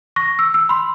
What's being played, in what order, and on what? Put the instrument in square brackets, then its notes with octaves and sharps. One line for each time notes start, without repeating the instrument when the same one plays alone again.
[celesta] C#6 A#6
E6
E6
B5 C6